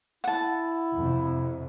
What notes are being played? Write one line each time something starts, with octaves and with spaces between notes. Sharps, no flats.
E4 F#5 A5
F2 C3